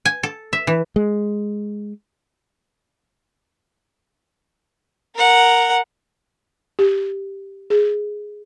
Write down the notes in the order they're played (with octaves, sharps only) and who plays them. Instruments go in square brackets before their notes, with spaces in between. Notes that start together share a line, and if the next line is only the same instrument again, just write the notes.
[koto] G#5
A4
E5
E3
[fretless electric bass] G#3
[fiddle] A#4 F#5
[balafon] G4
G#4